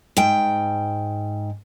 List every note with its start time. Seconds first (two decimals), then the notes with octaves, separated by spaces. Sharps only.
0.17 G#2 G5